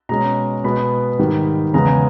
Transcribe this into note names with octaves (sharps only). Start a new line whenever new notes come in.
B2 G#3 C#4 A#5
B2 G#3 B3 B5
G#2 D#3 G3
E2 C#3 G#3 B3 A#5
G#5